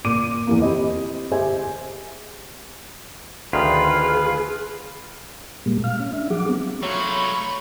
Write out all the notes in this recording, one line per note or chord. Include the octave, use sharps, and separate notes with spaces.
A#2 D6 D#7
E2 E3 A#3
C4 E4 G4 D#5
G4 G#4 C5 D#5 E5 G#5
D2 D#3 F4 G#4 B4
A#2 G3 G#3 A#3
F5 F6
C#4
D4 E5
F3 F#3 G#4 F#5 D6
G3 B3 C4
F#3 A3 F4 B5 C#6